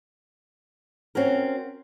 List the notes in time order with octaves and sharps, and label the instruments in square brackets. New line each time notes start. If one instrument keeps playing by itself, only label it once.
[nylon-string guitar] C4 C#4 F#4 A#4